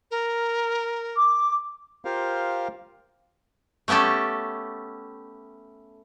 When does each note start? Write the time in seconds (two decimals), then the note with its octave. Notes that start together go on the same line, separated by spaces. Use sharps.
0.11 A#4
1.15 D6
2.05 F4 G4 A#4 C5 F5
3.88 A3 B3 C#4 G4 A4